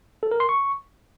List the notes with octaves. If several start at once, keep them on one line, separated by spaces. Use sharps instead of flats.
A4
A#4
C6
C#6